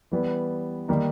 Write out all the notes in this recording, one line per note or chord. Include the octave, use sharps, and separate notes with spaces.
E3 G3 B3
D#3 G3 A#3 D#4